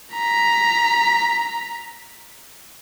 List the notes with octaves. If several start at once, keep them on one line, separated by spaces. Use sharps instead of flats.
A#5 B6